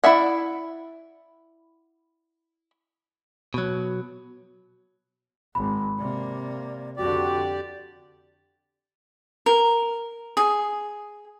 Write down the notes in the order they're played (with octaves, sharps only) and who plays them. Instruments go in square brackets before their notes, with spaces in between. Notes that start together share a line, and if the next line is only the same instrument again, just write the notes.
[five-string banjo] E4 D5 E5 F#5
[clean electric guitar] B2 F#3
[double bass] G#1 [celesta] B5
[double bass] C3 A#3 [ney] D5
[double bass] F2 D3 [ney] F#4 [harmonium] G4 D5
[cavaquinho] A#4
G#4